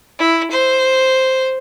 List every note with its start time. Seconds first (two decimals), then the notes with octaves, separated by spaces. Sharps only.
0.19 E4
0.51 C5